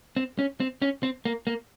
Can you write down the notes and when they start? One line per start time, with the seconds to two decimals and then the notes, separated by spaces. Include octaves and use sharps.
0.17 C4
0.39 C#4
0.60 C4
0.82 C#4
1.03 C4
1.25 A#3
1.47 A#3